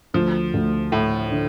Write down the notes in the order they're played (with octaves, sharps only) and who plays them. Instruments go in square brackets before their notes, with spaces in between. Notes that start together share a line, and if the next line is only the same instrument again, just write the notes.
[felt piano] D2 [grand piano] F3
[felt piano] D2
[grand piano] A2 [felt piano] A3
[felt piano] D3